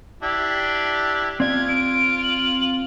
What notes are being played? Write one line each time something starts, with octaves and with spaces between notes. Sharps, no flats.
D4 E4 G4
C4 F4 D5 G#6
D7
F#7